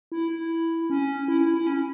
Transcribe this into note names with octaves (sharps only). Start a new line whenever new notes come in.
E4
C#4
E4
E4
E4
C#4